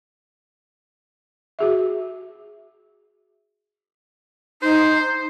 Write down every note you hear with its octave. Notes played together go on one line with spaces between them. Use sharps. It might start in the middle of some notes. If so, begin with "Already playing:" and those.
F#4 G#4 E5
D#4 C5